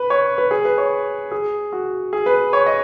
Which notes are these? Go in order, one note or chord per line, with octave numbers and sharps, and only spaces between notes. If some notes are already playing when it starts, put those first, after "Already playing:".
Already playing: B4
C#5
B4
G#4
B4
C#5
G#4
F#4
G#4
B4
C#5
D#5